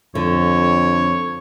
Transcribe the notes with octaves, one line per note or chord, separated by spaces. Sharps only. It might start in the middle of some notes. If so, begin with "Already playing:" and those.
F2 D3 C#5